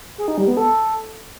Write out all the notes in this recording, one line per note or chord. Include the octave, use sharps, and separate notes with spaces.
G#4
D#4
G3
B3
A4